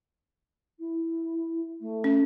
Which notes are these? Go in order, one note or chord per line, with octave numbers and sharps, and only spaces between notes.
E4
A3
C#4